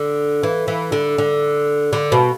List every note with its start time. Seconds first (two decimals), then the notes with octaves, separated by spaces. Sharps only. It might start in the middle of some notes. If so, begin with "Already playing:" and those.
Already playing: D3
0.43 E3
0.68 E3
0.92 D3
1.18 D3
1.93 D3
2.12 B2